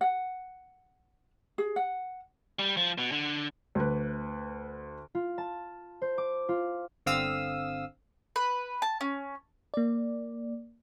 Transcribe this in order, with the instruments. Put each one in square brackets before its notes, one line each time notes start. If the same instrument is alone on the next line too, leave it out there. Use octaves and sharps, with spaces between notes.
[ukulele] F#5
G#4
F#5
[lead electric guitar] G3
F3
B2
D3
[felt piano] D2 B4
[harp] F4
A5
C5
D6
F4
[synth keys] G1 D3 C4 F5 D#6 E6
[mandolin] B4
A5
C#4
[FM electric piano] A#3 D5